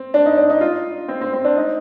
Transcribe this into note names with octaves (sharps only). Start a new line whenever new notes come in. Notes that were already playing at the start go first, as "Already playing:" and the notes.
Already playing: C4
D4
D#4
D4
D#4
F4
C4
C4
C4
D4
D#4